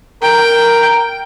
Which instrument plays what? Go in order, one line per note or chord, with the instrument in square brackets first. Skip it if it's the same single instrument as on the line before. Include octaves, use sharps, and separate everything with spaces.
[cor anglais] A#4 [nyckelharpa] G5